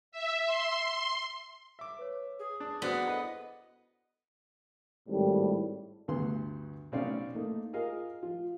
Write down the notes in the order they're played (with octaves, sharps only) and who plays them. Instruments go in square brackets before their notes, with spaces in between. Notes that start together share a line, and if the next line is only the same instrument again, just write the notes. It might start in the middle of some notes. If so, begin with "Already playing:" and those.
[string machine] E5
C6
[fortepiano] E5 D6
[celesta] B4 C#5
[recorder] G#4
[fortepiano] D4 [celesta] A5
[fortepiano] F#2 D4 F#6 [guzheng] B3 [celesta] F#4 C5 D5
[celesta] E4 A4 [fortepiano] B4 [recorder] D#5
[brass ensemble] G#1 A2 G3
[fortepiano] D2 G2 B3 C6
B1 C4 C#4 D5 F5
A3 A#3 D#4
F4 G#4 A#4 D#5 F5
F3 F4